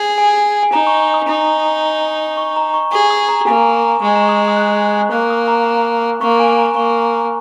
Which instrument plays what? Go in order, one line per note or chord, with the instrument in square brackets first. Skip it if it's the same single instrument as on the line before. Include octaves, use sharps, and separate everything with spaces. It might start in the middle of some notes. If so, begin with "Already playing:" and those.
Already playing: [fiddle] G#4
[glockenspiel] G#5
G#5
[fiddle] D#4 [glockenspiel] A#5
[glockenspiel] C#6
C#6
D#6
[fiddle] D#4
[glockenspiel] C#6
A#5
C#6
[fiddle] G#4 [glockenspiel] C#6
[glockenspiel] D#6
A#5
[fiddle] A#3 [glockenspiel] G#5
[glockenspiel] A#5
[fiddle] G#3 [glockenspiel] C#6
[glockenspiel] A#5
C#6
D#6
D#6
F#6
[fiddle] A#3 [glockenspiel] F#6
[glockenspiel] D#6
A#5
A#5
[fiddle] A#3 [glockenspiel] C#6
[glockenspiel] G#5
A#5
[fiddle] A#3 [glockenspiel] C#6